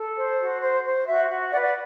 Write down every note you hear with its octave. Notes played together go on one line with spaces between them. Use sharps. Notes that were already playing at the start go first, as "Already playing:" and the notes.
Already playing: A4
C5
F#4
C5
C5
F#4 E5
F#4
B4 D5 F#5
D5 F#5